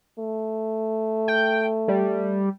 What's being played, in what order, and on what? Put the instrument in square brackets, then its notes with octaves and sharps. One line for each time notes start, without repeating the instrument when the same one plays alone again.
[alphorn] A3
[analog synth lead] G5
G3